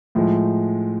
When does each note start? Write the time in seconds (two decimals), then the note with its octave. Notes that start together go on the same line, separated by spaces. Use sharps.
0.15 A2 F3 G#3